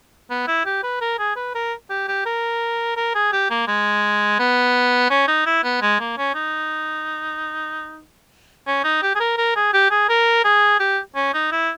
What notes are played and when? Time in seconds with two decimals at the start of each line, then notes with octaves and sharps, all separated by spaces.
0.30 B3
0.48 E4
0.66 G4
0.83 B4
1.01 A#4
1.19 G#4
1.36 B4
1.55 A#4
1.90 G4
2.08 G4
2.26 A#4
2.97 A#4
3.15 G#4
3.32 G4
3.50 A#3
3.68 G#3
4.39 B3
5.10 C#4
5.28 D#4
5.46 E4
5.64 B3
5.82 G#3
6.00 A#3
6.17 C#4
6.35 D#4
8.67 C#4
8.84 D#4
9.02 G4
9.15 G#4
9.20 A#4
9.38 A#4
9.56 G#4
9.74 G4
9.91 G#4
10.09 A#4
10.45 G#4
10.80 G4
11.16 C#4
11.34 D#4
11.52 E4